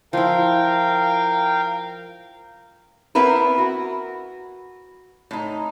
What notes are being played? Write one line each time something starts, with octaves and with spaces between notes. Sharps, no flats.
F3 E4 A#4 F5 G5
B3 C4 E4 A#4 B4
F#4
A2 D#4